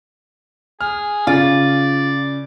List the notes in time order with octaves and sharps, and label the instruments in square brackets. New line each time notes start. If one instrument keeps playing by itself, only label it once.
[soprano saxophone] G#4 [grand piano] F6
[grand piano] C#3 [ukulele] F4 [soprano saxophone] D5